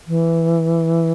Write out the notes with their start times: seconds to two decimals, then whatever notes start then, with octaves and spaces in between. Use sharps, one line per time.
0.08 E3